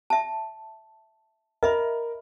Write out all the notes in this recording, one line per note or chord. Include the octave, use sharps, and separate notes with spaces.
E5 A5
A#4 D#5 E5 B5